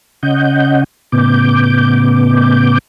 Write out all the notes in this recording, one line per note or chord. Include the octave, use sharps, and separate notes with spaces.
C#3 C#4 D#5 F#5 G6
A2 C#3 B3 D6 G6